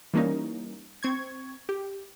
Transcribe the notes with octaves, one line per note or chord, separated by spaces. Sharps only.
E3 G3 A#3 C#4 D#4
C4 C#6 G#6
G4